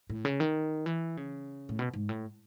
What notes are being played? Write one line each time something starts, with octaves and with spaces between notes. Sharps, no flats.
A2
C#3
D#3
E3
C#3
A2
B2
G#2
A2